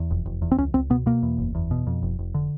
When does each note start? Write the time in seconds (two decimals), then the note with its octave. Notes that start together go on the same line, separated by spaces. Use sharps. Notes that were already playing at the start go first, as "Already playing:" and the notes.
Already playing: E2
0.11 F1
0.26 F1
0.42 E2
0.52 C4
0.58 C#2 C#4
0.74 C#2 C4
0.90 B2 B3
1.06 B2 A#3
1.23 E2
1.38 F#1
1.55 E2
1.71 B2
1.87 F2
2.03 F1
2.19 F1
2.34 D3